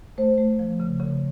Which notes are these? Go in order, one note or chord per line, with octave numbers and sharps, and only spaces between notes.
A3 C5
A3
F3
C#3
C#3